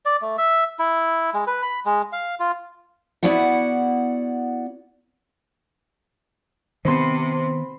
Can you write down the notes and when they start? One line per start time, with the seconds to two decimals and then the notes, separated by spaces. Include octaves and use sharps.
0.05 D5
0.22 A3
0.38 E5
0.79 E4
1.34 G#3
1.47 B4
1.62 B5
1.85 G#3
2.12 F5
2.40 F4
3.23 B3 E4 F#4 D5 F#5
6.85 C3 D#3 B3 C5 B5 C6